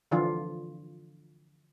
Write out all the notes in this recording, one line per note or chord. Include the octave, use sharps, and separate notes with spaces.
D3 E3 F3 D4 F4